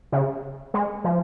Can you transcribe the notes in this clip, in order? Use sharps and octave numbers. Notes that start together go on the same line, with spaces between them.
C#3
G#3
F3